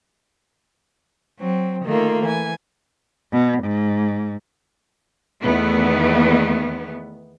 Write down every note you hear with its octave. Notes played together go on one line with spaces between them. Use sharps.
F#3 C4
D#3 A3 A#3 F4
E3 G#5
B2
G#2
E2 D#3 A3 B3